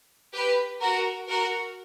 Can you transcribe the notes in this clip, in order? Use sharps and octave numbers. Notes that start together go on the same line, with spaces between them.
G4 B4
F#4 A#4
F#4 A#4